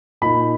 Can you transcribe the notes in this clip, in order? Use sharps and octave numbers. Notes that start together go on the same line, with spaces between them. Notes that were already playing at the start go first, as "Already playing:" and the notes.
A#2 A#3 D#4 B5